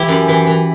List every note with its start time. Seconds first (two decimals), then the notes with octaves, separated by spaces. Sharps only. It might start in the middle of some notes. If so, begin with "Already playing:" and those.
Already playing: E3 E4 G4
0.08 F#2
0.28 E3
0.46 E3